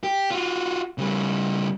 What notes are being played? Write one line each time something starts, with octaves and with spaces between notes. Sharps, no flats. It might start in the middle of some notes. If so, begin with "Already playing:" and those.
G4
F4 F#4
C#3 G3